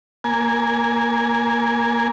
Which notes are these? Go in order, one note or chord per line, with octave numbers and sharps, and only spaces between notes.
A#3 G#5